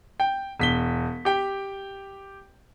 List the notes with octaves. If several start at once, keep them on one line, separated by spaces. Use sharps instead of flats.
G5
E1 B6 G7
G4 G5